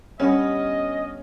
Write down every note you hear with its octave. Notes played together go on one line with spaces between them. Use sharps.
G2 B3 C#4 D#5 F#5